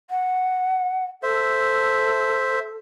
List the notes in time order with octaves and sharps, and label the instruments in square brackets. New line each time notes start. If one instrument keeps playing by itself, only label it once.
[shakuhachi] F#5
[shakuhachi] A4 [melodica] C5 E5